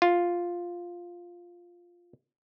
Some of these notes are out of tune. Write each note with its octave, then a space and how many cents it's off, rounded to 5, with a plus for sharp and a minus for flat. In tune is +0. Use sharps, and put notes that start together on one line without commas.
F4 +5